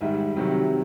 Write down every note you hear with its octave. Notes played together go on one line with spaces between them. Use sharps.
G#2 D#3 G3 E5
C3 D#3 F#3